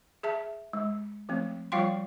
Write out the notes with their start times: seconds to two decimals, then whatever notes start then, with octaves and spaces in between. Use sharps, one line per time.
0.23 G#4 E5 A5
0.73 G#3
1.29 F3 A3 C4
1.72 F3 G3 F4 F5 G5 C6